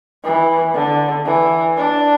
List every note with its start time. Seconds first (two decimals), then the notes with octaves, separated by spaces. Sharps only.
0.24 E3
0.75 D3
1.26 E3
1.77 D4